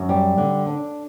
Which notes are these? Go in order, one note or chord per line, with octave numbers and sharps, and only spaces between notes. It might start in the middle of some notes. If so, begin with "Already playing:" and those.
Already playing: F#2
G3
D3
D4